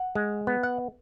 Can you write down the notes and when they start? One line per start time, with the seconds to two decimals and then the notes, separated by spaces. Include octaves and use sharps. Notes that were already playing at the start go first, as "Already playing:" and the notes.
Already playing: F#5
0.15 G#3
0.47 B3
0.63 F#5